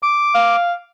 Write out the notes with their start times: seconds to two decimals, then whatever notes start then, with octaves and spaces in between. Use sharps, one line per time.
0.03 D6
0.35 F5